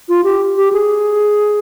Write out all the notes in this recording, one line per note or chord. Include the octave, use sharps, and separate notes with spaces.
F4
G4
G4
G#4